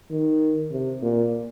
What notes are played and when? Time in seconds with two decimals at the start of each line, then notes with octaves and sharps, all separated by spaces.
0.11 D#3
0.72 C3
1.02 A#2